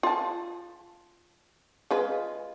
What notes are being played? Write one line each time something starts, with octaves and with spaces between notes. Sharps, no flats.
F4 A5
G#3 F4 B4